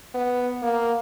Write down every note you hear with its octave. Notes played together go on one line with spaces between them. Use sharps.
B3
A#3